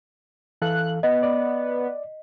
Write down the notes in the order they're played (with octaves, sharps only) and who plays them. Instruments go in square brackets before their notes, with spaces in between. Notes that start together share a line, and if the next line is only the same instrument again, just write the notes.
[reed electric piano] E3 A4 F5 [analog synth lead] F#6
[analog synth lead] B3 [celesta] D#5
[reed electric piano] D5